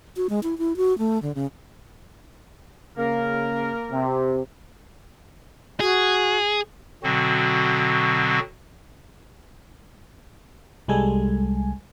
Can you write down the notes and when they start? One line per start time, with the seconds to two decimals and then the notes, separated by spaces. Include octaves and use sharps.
0.17 F#4
0.29 G#3
0.43 E4
0.58 E4
0.77 F#4
0.98 A3
1.22 D3
1.35 C#3
2.98 C#3 A#3 A#4
3.92 C3
5.80 F#4 G#4
7.03 B2 D3 F#3 C4 F#4
10.88 C2 G3 G#3 A4 G#5